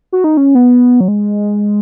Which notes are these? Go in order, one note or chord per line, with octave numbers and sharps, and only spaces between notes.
F#4
D#4
C#4
B3
F#3
G#3